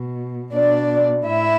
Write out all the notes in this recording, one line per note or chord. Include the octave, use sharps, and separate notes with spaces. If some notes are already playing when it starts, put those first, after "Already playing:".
Already playing: B2
B2 D4 D5
A2 E4 E5